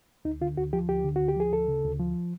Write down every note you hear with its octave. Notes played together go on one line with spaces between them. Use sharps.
D2 D#4
D3 F4
D2 F#4
F3 G4
D2 G4
D3
F#4
D2
G4
F3 G#4
D2 A4
C#3
D2
F3